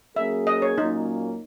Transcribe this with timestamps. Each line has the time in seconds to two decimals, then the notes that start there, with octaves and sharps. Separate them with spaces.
0.16 F#3 A#3 C#4 G#4 E5
0.47 D#5
0.62 C#5
0.78 A#2 F#3 A#3 C#4 D#4